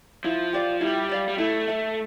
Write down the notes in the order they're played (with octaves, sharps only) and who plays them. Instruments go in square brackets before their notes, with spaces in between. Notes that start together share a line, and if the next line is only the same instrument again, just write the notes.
[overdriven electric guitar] F3 [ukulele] E4
[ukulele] G4 D5 F5
[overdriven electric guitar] G3 [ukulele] E4
[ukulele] G4 D5 F5
[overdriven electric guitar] G3
[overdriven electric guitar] A3 [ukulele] E4
[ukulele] A4 E5